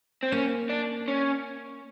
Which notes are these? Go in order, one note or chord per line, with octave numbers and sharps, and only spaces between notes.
C4
A#3 C#4
D4
C#4